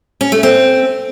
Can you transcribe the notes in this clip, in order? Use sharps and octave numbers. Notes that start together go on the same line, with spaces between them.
C#4
A3
C4